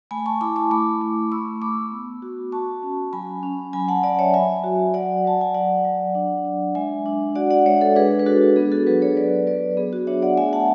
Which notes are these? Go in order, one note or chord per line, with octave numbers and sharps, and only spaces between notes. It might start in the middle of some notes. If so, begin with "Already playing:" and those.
A3 G#5 B5
A5 C#6
E4 B5 D6
A5 C#6
A3 B5 D6
A3
A3 C#6 E6
A3 B5 D6
B3
F#4
F#4 A5 C#6
C#4
F#3 G#5 B5
C#4
F#3 G#5 B5
F#5 A5
F#3 D5 F#5
C#5 E5
F#3 E5 G#5
F#4
F#3 D5 F#5
F#3 A5
G#5
F#3 D5 F#5
F#3
D4
D4
G#3 E5 G#5
D4
F#4 D5 F#5
D5 F#5
G#3 C#5 E5
A4 C#5
D4 G#4 B4
B4
D4 F#4 A4
B3 G#4
F#4 A4
F#3 G#4 B4
A4 C#5
F#3 B4 D5
F#3 B4 D5
B3 G#4
F#4
D4 C#5 E5
D5 F#5
A3 E5 G#5
F#5 A5